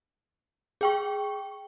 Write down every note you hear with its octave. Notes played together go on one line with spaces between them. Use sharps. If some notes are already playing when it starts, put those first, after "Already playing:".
G#4 G5 C#6